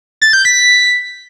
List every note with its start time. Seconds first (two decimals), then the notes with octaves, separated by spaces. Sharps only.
0.22 A6
0.33 G6
0.45 B6